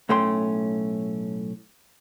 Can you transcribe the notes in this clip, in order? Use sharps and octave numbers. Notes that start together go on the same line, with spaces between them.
B1 A2 A3 C#4 G5 C6